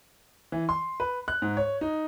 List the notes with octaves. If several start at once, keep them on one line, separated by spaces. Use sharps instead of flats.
E3
C6
B4
F#6
G#2
C#5
D#4